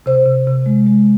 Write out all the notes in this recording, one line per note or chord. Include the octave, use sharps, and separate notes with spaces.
C3 C5
C3
C3
G#3
G#3